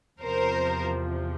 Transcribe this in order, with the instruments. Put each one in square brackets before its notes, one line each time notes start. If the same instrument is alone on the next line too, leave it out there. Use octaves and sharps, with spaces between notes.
[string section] E2 C3 F3 A#4 C5